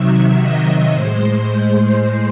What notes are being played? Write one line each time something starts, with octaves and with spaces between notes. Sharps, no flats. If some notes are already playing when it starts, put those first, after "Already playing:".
Already playing: C3 D#3 F#3 E5
D#5
A2 G#3 C5